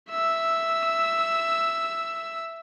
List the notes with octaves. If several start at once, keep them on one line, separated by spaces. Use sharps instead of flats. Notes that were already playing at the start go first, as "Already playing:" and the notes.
E5 E6